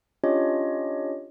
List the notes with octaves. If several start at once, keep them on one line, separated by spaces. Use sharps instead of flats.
C#4 D4 F4 G4 C#5 D#5